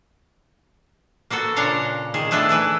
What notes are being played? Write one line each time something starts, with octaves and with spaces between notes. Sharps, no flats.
A#3 B3 F#4 A4
A#2 C#3 D4 C#5 F5 A#5
D#3 G#4
A3 B3 D4 E4 G#4
E3 E4 B4